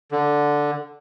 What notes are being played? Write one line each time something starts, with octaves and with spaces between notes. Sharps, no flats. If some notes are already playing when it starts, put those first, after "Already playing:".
D3